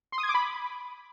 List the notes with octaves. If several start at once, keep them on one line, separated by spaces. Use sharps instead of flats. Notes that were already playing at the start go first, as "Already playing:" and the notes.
C6
D#6
G#6
D6
B5